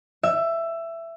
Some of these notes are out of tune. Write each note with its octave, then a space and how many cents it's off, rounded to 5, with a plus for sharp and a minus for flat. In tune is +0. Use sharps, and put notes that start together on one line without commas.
E5 +15